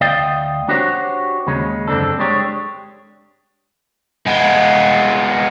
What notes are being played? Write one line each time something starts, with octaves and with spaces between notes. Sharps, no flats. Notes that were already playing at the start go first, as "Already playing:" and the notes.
D2 D5 D#5 F5 G5
D4 F#4 G4 C5 C#5
D#2 C#3 G#3 C#4
F#2 D3 C4 D4 A4
G#3 D4 G4 C#5
G#3 B3